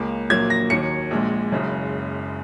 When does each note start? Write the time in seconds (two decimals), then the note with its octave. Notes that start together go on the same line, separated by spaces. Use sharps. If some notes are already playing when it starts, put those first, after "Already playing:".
Already playing: C#2 C#3 A#3
0.30 A#1 A#2 F#3 A#3 G#6
0.50 A#6
0.70 D#2 D#3 F#3 A#3 C#7
1.11 A#1 A#2 G#3
1.51 F#1 F#2 C#3 G#3